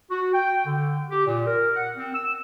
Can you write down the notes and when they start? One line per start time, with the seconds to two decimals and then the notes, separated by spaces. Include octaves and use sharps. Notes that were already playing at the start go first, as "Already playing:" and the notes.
0.11 F#4
0.34 G5
0.66 D3
1.10 G4
1.26 A#2
1.47 A#4
1.76 F#5
1.97 C4
2.15 E6